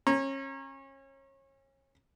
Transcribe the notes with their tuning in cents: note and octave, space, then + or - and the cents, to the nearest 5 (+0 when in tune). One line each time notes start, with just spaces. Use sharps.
C#4 -30 A#5 +0